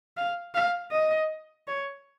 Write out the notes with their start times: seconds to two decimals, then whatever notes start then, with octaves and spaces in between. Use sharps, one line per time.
0.17 F5
0.55 F5
0.92 D#5
1.68 C#5